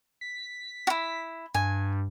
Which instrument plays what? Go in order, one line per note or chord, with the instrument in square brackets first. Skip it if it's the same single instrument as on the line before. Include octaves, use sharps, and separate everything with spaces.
[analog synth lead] B6
[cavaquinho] E4 F#4
[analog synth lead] G2 [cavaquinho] G#5